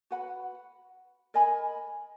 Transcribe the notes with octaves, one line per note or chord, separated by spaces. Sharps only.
F#4 B4 F#5 B5
A#4 D#5 G#5 B5